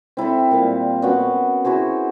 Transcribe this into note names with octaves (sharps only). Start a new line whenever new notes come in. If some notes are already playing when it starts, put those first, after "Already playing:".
C4 E4 A4 E5
A#2 G3 F5
B3 C#4 F#4 F#5
E4 F#4 G#4 C5